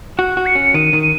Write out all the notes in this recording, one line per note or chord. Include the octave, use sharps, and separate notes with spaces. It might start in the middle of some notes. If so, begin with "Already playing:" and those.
F#4 F#6
F#4
C#7
C#4
D#3 D#7
D#3
D#7